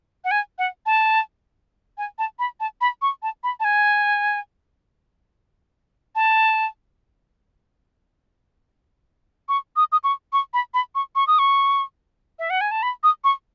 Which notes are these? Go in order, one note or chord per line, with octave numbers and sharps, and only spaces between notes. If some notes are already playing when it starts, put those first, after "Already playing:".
F#5
G#5
F#5
A5
G#5
A5
B5
A5
B5
C#6
A5
B5
A5
G#5
A5
C#6
D#6
D#6
C#6
C#6
B5
B5
C#6
C#6
D#6
C#6
E5
F#5
G#5
A5
B5
D#6
C#6